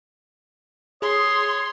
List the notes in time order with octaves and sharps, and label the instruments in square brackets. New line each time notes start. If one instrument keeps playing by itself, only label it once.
[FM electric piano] G#4 [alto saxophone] C#5 [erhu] C6 [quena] D#6